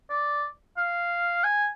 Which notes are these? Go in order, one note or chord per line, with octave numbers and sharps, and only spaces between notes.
D5
F5
G#5